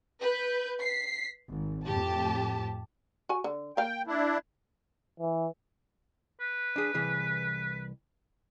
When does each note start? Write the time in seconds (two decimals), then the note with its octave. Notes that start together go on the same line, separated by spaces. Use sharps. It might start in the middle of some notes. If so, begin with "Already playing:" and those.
0.21 B4 G6
0.81 B6 C7
1.49 G#1
1.86 F2 A2 G4 A5
3.29 F#4 G#5
3.44 D3
3.77 A#3 F5 G5
4.07 D4 E4
5.20 E3
6.40 B4
6.76 D4 G#4
6.94 C2 E3 G#4